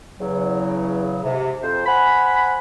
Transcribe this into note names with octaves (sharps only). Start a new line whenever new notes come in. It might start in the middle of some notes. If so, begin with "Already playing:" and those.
E2 C#3 F#3
G#2 C3
F2 C5
C5 F#5 G#5 B5